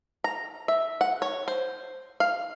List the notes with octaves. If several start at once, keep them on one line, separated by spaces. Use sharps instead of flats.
A#5
E5
F#5
C#5
C5
F5